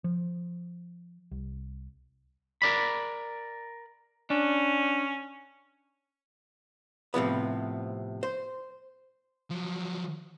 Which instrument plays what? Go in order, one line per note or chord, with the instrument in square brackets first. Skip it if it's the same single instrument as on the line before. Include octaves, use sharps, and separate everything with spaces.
[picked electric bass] F3
C2
[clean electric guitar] A#4 D5 B5
[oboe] C#4 [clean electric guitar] D4
[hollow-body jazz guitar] A2 C3 F3 B3
C5
[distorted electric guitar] F3 F#3